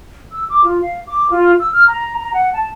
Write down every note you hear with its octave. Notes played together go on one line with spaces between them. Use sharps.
E6
D6
F4
F5
D6
F4
E6
F6
A#5
A#5
F#5
A5